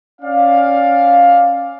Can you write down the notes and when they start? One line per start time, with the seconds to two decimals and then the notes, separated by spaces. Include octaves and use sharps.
0.21 C#4 D5 F5